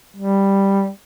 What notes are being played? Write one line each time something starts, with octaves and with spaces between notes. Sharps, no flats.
G3